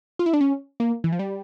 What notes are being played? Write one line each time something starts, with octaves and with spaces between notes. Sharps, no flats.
F4
E4
D4
C#4
A#3
E3
F3
G3